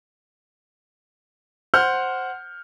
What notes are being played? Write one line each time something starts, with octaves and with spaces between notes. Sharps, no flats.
C5 F#5 F6 G6